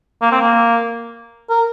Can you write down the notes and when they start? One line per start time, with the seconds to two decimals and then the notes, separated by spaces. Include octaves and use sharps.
0.22 A#3
0.31 C4
0.41 A#3
1.50 A#4